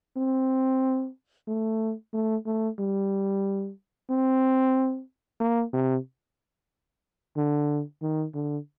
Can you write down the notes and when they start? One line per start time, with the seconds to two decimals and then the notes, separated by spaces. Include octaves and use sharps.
0.17 C4
1.48 A3
2.14 A3
2.46 A3
2.79 G3
4.10 C4
5.40 A#3
5.73 C3
7.37 D3
8.02 D#3
8.34 D3